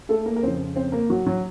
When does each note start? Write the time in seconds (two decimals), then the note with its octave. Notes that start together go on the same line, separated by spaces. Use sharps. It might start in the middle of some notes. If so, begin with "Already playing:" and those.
0.09 A3 A4
0.26 A#3 A#4
0.36 A#4
0.43 F2 C#3 F3 C4 C5
0.76 C4 C5
0.92 A#3 A#4
1.10 F#3 F#4
1.27 F#3 F#4